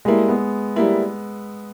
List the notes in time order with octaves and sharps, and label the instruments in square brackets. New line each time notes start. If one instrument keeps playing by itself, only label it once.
[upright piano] G3 A#3 E4 [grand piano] G#3
[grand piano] B3
[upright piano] G3 A#3 E4